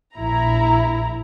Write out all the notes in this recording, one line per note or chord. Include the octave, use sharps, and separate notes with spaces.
A#1 E4 A#5